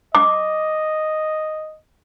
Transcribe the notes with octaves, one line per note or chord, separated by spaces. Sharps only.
D#5 D6